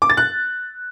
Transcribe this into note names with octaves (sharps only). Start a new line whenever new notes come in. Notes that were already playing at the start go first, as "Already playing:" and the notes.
D6
A6
F#6